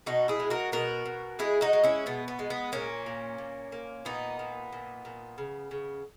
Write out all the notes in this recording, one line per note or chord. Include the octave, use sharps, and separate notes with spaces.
B2 D#4 F#4
E4 G#4
G#3
F#4 A#4
B2 F#4 A#4
B2
G#3 E4 G#4
D#4 F#4
G#3
C#4 E4
B2 B3
B3
G#3
B3
A#2 A#3 C#4
A#2
A#2
A#3
A#2 B3 D#4
A#2
A#2
A#2
C#3
C#3